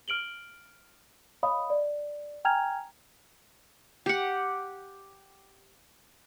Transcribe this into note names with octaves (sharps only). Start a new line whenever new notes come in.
F6 D7 F#7 G7
C#5 D#5 F5 B5 D#6
D5
G5 G#5 A#5 F6 G#6 F7
G4 F#5